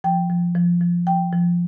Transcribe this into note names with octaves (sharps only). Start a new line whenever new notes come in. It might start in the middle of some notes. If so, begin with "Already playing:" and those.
F3 G5
F3
F3
F3
F3 G5
F3